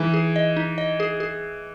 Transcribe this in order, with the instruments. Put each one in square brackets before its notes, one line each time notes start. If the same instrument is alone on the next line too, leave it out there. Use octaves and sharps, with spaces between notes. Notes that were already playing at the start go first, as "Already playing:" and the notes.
Already playing: [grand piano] E3 [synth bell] D#4 G#4
[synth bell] G#4
D#5
D#4
D#5
G#4
G#4